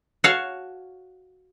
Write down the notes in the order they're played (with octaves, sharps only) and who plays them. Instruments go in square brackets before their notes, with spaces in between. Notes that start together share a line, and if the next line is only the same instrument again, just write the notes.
[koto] F#4 C#5 F5 A5